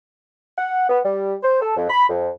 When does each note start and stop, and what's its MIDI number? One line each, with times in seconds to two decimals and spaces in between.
0.57 0.87 78
0.89 0.99 59
1.04 1.34 55
1.43 1.60 72
1.61 1.76 69
1.77 1.89 41
1.90 2.09 83
2.09 2.29 41